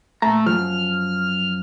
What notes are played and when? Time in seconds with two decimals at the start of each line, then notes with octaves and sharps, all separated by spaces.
0.22 A#2 A3 A#5
0.46 F#2 F3 F6